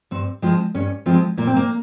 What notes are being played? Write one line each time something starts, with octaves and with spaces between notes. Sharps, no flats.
G2 C4
F3 G#3 C4
G2 C#4
F3 G#3 C4
A#2 A#3
C4
A#3